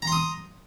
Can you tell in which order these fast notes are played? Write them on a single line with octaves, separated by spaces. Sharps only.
A#5 C6 D#6